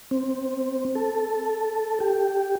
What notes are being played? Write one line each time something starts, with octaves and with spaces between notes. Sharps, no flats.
C4
A4
G4